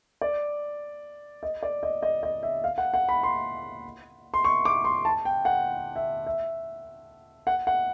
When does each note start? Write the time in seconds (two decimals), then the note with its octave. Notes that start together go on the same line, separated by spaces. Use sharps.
0.21 D5
1.43 D#5
1.63 D5
1.83 D#5
2.03 D#5
2.23 D#5
2.43 E5
2.64 F5
2.78 F#5
2.94 F#5
3.09 B5
3.23 C6
4.34 C6
4.45 C#6
4.65 D6
4.85 C6
5.05 A5
5.25 G5
5.45 F#5
5.96 E5
6.27 E5
7.47 F#5
7.67 F#5